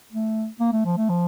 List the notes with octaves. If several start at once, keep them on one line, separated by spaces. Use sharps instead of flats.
A3
A#3
A3
F3
A3
F3